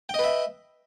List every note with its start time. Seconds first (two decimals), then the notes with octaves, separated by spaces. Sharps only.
0.09 G5
0.14 D#5
0.19 B4
0.24 E5